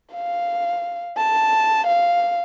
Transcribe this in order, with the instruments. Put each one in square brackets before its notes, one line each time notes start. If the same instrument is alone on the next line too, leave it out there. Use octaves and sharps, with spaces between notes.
[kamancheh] F5
A5
F5